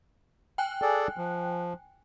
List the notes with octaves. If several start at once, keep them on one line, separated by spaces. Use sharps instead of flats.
G5 G#5 F#6
G#4 A4 D5
F3